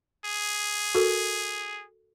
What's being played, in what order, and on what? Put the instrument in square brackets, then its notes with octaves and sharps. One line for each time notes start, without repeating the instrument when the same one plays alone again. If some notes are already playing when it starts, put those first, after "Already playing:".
[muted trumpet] G#4
[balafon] F#4 A4 A#4